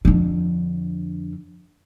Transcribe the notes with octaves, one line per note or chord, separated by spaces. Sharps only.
F2 D3